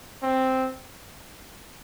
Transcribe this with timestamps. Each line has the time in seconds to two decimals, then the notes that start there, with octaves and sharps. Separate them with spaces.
0.23 C4